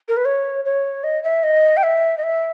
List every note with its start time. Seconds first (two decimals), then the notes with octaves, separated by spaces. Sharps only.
0.09 A#4
0.17 B4
0.25 C#5
0.65 C#5
1.04 D#5
1.23 E5
1.43 D#5
1.77 G5
1.84 E5
2.18 D#5
2.24 E5